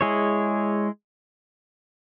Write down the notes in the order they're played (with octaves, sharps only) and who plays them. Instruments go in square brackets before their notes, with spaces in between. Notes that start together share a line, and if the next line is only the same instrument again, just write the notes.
[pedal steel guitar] G#3 E4 G#4 C#5